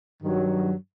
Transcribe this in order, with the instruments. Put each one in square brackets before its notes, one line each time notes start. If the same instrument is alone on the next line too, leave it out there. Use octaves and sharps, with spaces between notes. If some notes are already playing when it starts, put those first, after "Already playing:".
[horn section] G2 D#3 F#3